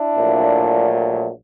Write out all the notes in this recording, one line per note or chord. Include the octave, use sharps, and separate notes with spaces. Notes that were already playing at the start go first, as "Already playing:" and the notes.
Already playing: D4 E4
A#1 A#2 F#3 A3